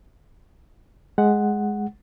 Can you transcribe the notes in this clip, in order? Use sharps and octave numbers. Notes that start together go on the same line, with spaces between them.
G#3 F#5